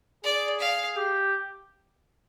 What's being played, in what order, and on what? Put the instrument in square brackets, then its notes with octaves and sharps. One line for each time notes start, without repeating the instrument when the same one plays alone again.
[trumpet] G#4 [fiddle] D5
[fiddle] F5
[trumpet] G4